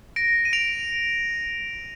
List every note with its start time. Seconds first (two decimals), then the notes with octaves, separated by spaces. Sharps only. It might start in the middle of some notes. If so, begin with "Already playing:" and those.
0.16 A#6 D7
0.45 D#7
0.53 D7 F7